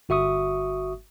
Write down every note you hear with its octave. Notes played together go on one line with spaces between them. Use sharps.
G1 F#4 E5 C#6 D#6